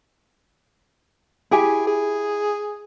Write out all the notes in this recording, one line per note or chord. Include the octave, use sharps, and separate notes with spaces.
E4 G4 G#4 G#5
G#4